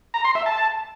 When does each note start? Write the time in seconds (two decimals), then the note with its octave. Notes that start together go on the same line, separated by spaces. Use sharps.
0.14 A#5
0.25 C6
0.35 E5
0.46 A5